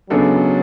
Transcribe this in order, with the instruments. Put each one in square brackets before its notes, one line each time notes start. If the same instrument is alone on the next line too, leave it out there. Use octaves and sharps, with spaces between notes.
[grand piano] C#3 G#3 B3 D4 A4 [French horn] F#3